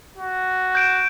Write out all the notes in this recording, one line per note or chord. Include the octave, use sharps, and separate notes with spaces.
F#4
G6 D7 E7